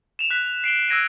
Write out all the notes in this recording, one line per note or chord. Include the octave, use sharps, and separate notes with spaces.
E7 F7
F#6 B6
F7
C7 D7 F#7 G7
E6 F#6 G#6 A#6 D7 D#7